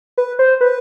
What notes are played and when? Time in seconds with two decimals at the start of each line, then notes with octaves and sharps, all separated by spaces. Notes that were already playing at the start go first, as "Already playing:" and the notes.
0.18 B4
0.39 C5
0.61 B4